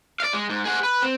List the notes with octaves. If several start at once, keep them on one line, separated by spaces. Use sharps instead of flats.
D5 F5
G#3
G#2
G#4 F#5
B4
C4